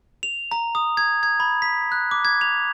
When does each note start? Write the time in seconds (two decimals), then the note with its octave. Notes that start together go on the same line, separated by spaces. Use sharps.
0.23 F7
0.51 A#5
0.75 D#6
0.97 G#6
1.23 G#6
1.40 B5
1.62 B6
1.92 F#6
2.11 D6
2.25 G#6
2.41 F7